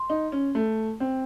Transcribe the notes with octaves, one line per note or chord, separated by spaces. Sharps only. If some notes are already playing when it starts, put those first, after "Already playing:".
Already playing: C6
D#4
C#4
A3
C4